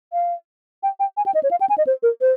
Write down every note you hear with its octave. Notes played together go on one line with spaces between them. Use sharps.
F5
G5
G5
G#5
G5
D#5
C#5
F5
G5
G#5
D#5
C5
A#4
C5